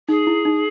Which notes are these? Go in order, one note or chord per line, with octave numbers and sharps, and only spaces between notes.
D#4 G#4
E4
D#4